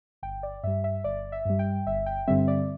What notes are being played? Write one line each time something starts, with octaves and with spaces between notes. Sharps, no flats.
G1 G5
D5
G2 G3 E5
E5
G1 D5
E5
G2 G3
G5
G1 E5
G5
G2 D3 G3 C4 E5
D5